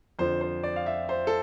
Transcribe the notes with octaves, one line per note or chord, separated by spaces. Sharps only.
F2 D3 F3 C5
C5
D5
F5
E5
C5
A4